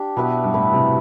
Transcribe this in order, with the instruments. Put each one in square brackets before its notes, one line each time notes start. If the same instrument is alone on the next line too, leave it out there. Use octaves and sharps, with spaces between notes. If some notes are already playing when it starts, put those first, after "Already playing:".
Already playing: [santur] D4 G4
[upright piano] B2 [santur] B3 E4 B4
[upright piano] G2
[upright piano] A2 [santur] B3 E4 B4
[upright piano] C3